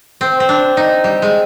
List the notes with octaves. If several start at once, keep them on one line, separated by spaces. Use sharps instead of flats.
C4
C4
D4
D#4
G3
G#3